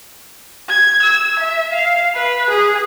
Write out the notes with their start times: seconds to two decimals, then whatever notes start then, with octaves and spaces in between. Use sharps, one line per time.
0.69 G#6
1.02 E6
1.39 E5
1.73 F5
2.15 B4
2.50 G#4